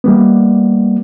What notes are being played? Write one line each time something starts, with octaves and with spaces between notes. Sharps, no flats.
G3 A#3 B3